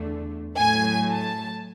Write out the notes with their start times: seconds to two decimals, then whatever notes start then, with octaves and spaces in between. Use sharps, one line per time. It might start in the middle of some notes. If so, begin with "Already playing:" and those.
Already playing: E2 D3 A3
0.57 A2 F#3 A3 G#5
1.12 A5